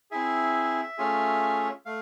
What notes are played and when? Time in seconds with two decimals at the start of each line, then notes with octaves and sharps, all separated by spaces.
0.11 C4 E4 G#4 E5
0.98 A3 C#4 F4 G#4
1.86 A3 F5